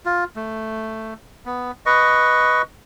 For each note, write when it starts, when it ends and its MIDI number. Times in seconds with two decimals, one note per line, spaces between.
0.06 0.24 65
0.36 1.14 57
1.46 1.71 59
1.86 2.62 71
1.86 2.62 75
1.86 2.62 85